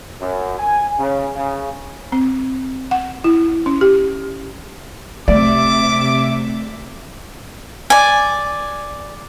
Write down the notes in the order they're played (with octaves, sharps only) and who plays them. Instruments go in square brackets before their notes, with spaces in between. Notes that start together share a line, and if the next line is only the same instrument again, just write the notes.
[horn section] F#2
G#5
C#3
C#3
[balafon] C4
F#5
E4
C#4
G4
[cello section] C3 E5 [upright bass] A3 [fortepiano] D5 [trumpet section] D6
[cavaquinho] D5 G#5